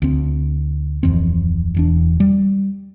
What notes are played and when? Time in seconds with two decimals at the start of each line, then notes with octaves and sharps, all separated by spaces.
0.02 D2 C4
1.03 D1 F2 E3 C4
1.75 E1 E2 D4
2.20 G3